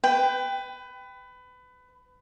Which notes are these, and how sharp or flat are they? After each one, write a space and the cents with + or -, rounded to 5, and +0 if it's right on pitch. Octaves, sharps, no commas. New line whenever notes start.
B4 +25 G5 +0 B5 +40